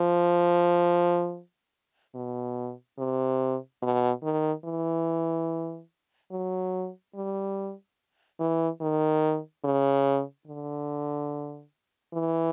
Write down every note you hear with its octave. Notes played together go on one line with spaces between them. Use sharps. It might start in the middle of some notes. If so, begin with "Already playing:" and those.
Already playing: F3
B2
C3
B2
D#3
E3
F#3
G3
E3
D#3
C#3
D3
E3